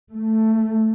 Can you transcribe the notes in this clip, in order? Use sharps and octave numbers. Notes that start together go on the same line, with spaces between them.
A3